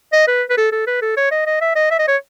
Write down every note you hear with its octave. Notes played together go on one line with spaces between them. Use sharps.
D#5
B4
B4
A4
A4
B4
A4
C#5
D#5
D#5
E5
D#5
E5
D#5
C#5